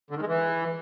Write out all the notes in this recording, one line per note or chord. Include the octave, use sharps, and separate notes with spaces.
D3
D#3
G#3
E3